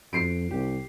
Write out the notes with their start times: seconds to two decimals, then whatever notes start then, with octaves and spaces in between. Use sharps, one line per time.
0.13 F2 C7 D7
0.51 C2 G4